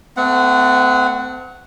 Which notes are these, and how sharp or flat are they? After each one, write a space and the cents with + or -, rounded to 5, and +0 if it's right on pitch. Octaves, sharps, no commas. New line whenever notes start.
A3 +0 C4 -40 F#5 +0